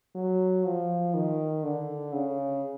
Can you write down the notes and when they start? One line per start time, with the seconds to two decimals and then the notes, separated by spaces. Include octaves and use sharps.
0.15 F#3
0.65 F3
1.14 D#3
1.64 D3
2.13 C#3